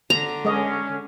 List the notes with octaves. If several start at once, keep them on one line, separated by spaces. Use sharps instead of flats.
D3 A#5
G#3 C#4 D#5